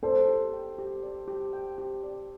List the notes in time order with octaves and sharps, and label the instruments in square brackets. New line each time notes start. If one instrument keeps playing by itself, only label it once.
[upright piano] A4 C5 [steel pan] D5
[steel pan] G4
G5
G4
D5
G4
G5
G4
D5